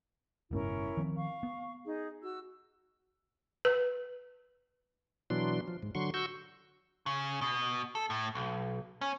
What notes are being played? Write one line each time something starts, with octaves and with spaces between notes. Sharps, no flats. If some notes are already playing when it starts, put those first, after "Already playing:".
F#1 G#2 B2 C#4 E4 A#4
D#3 F3 C4
F5 C#6
B3
D#4 G#4
F#4 E6
B4
B2 E3 F#3 D4 C6
F3
G#2
D3 F#3 C6 C#6
F#4 C#6 E6 G6
C#3
B2
A4
A2
B1
C#4